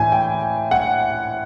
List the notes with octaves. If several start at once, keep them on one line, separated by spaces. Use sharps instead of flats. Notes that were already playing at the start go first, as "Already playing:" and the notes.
Already playing: A2 E3 G#5
G5
F#5